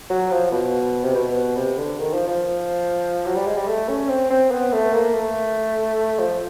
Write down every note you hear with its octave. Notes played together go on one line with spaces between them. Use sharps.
F#3
F3
B2
C3
B2
C3
D3
D#3
F3
F3
F#3
G3
G#3
G3
A3
C#4
C4
C4
B3
A3
A#3
A3
F3